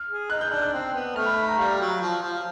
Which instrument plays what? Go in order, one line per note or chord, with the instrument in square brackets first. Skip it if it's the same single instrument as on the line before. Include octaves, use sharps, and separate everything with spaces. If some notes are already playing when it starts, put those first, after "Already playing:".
Already playing: [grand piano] F6
[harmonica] G#4
[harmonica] D#4 [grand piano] F#6
[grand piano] G6
[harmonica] D4 [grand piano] F#6
[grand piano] F#6
[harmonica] C4
B3
[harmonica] A3 [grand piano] F6
[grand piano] B5
B5
A#5
[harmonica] G3 [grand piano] F5
[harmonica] F#3
F3
F3